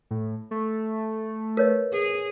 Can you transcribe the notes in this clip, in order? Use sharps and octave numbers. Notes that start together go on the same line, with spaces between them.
A2
A3
A#4 B4 C#5 D#5
G#4